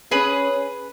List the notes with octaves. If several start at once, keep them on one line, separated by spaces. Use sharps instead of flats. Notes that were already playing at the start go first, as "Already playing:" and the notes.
C#4 G#4 B4